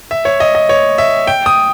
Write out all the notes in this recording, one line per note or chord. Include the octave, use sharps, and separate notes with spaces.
E5
C#5
D#5
D#5
C#5
E5
G5
D#6